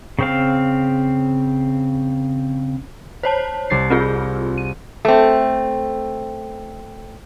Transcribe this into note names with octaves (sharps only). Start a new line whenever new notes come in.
C#3 C4 F5
C5 C#5 A5
C2 A6 C7
C4 F4 G#4
D#7
A3 C4